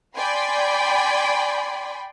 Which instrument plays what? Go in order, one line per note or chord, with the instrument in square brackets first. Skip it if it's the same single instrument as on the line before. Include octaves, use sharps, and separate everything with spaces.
[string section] D5 G5 G#5 B5 C6